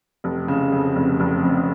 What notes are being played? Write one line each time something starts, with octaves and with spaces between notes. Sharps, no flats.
F1
C#3
F2
F1
F1
F2